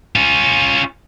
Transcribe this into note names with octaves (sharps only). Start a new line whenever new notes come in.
C#4 F4